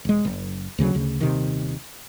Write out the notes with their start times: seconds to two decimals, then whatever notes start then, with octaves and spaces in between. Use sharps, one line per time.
0.05 E1 G#3
0.25 F#1
0.78 D2 C#3 E3 F#3
0.94 D2 C#3
1.21 D#1 C3 D#3